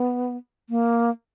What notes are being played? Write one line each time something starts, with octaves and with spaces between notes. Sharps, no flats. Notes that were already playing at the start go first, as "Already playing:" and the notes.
Already playing: B3
A#3